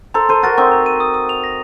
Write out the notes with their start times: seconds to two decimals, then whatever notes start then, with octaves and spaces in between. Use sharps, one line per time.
0.14 A4 C5 A#5
0.29 A4 C5 D#7
0.43 F#4 A#4 A6
0.57 C4 D#4 C#6
0.72 A#5
0.86 D#7
1.00 D#6
1.14 D#6
1.29 F7
1.44 A#6